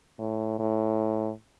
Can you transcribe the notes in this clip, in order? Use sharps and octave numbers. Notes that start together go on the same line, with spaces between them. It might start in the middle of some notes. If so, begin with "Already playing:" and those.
A2
A2